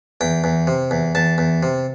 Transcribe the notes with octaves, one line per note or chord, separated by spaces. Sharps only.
E2 G5
E2
C3
E2
E2 A5
E2
C3